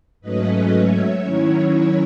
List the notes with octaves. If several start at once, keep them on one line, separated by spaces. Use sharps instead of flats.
G#2 F#3 A3 C#4 B4 D#5
C#5 E5
D#3 F#3 C#4 E4 C#5
C#5